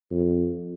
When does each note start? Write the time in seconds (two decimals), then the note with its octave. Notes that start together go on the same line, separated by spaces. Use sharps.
0.11 F2